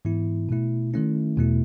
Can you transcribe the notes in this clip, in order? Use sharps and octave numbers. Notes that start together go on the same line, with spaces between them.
G#2 E3 B3 E4
B2 A3 E4
D#3 A3 C#4 E4
E2 B2 A3 E4